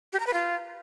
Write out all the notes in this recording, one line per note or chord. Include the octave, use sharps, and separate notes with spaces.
G4
A#5
B4
F4